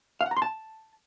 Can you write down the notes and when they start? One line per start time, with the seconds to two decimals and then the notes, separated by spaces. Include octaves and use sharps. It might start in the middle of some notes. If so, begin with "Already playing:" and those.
0.21 F5
0.26 F#5
0.31 A#5
0.37 C6
0.42 A5